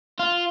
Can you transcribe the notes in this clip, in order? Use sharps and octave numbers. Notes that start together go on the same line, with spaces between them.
F4